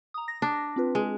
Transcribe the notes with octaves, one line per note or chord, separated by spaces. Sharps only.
A#5 D#6
A#6
D4
C4 F4 B4
G#3